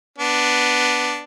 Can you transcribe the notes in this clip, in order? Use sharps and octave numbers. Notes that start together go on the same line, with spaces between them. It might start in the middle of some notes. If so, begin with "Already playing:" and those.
B3 D4